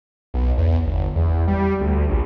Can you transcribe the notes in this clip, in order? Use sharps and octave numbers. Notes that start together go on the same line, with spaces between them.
B1
E2
G1
E2
G3
D2
A#1